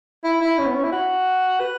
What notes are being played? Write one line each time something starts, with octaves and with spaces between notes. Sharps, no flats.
E4
E4
C#4
B3
C#4
E4
F#4
B4